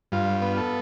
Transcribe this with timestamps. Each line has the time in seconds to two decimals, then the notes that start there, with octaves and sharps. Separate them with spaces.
0.12 G2 F4
0.42 B3
0.57 A4